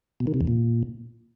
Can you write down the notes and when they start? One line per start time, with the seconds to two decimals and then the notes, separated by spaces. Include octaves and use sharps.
0.20 B2
0.27 D#3
0.34 C3
0.41 E2
0.47 A#2